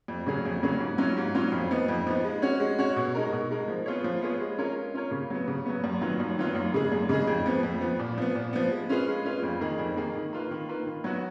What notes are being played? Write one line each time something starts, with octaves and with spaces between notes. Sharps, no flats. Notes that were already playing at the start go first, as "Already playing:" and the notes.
F2
C#3 F#3 C#4 G#4
F2
C#3 F#3 C#4 G#4
G#2
F#3 C#4 F4
G#2
F#3 C#4 F4
F2
F3 B3 D#4
F2
F3 B3 D#4
G#3
C#4 F#4 C#5
G#3
C#4 F#4 C#5
B2
G#3 D#4 A#4
B2
G#3 D#4 A#4
F3
B3 F4 G#4 C#5
F3
B3 F4 G#4 C#5
G#3
C#4 F4 A#4 C#5
G#3
C#4 F4 A#4 C#5
C#3
F#3 B3
C#3
F#3 B3
F#2
D#3 F#3 B3 F4
F#2
D#3 F#3 B3 F4
F#2
C#3 G#3 D#4 G#4
F#2
C#3 G#3 D#4 G#4
F2
F3 B3
F2
F3 B3
A#2
F3 B3
A#2
F3 B3
G#3
C#4 F4 G#4 B4
G#3
C#4 F4 G#4 B4
F2
D#3 A#3 D#4 G#4
F2
D#3 A#3 D#4 G#4
D#3
A#3 F4 B4
D#3
A#3 F4 B4
D#3
F#3 B3 F#4